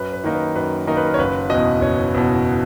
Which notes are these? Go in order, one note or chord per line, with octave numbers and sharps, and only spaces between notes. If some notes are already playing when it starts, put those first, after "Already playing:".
Already playing: F#2 B4
B4
D#3 A#3 D#4
B4
F#2 B4
D#3 A#3 D#4 A#4
B4
A#4
C#5
F#1 B4
E2 B2 D#5
F#1 C#5
E2 B2